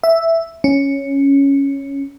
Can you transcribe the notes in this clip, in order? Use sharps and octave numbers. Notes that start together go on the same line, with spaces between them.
E5
C#4